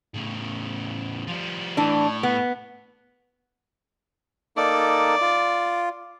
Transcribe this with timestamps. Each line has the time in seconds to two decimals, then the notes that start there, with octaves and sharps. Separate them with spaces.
0.14 A2 C#3
1.27 F3 G3
1.77 A2 E3 D4
2.23 B3
4.57 A#3 D#4 A4 D5
5.21 F4